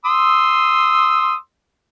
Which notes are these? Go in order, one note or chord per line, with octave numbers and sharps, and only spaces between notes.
C6 D#6 E6